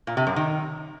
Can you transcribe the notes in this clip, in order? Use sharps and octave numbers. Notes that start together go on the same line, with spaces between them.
A#2
C3
F#2
D#3